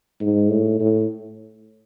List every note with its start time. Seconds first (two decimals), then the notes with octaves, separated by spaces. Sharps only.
0.21 G#2
0.50 A2
0.79 A2